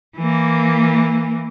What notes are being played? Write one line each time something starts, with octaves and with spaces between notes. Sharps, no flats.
E3 A#3